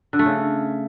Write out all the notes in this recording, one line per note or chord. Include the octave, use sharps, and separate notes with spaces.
D3
A3
C#3